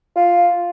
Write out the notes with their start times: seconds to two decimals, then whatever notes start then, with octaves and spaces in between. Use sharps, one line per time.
0.16 F4